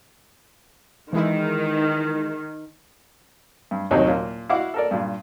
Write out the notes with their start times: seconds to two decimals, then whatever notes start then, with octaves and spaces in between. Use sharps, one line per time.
1.13 D#3 E3 G#3 E4
3.71 G2
3.91 A1 D#2 C3 F#3 D#4
4.07 A#2 A#3
4.49 E4 F#4 F5 F#5 D6
4.74 A4 A#4 D5
4.91 G2 A#2